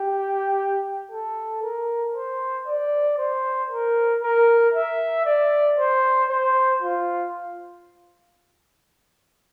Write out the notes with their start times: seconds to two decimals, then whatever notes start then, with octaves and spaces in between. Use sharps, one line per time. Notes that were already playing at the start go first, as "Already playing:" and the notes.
Already playing: G4
1.11 A4
1.63 A#4
2.14 C5
2.67 D5
3.18 C5
3.70 A#4
4.22 A#4
4.74 E5
5.26 D5
5.78 C5
6.30 C5
6.82 F4